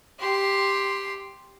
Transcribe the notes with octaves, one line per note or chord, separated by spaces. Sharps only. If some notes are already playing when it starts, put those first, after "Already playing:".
G4 C6